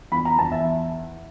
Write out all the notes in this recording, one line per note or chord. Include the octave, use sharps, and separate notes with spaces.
E2 B5
A#5
E2 A5
E5